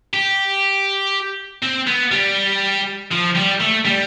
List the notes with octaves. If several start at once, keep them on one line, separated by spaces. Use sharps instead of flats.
G4
C4
B3
G3
F3
G3
A3
G3